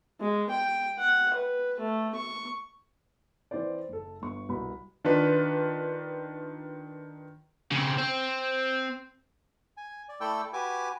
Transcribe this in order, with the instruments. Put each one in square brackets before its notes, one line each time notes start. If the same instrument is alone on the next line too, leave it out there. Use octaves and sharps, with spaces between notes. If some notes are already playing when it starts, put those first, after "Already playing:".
[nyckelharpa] G#3
G5
F#5
B4
A3
C#6
[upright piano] E3 C4 E4 C5 D5
F#1 A4
G1 C#6
C2 B2 B5
[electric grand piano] D#3 D4 F4 B4
[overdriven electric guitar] C#3 C4
C4
[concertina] G#5
D5
A3 E4 A4 D5 G5 E6
F#4 G4 B4 G#5 D6